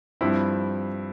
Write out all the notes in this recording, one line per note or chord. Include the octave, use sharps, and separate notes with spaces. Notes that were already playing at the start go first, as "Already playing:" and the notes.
G2 F3 C4 E4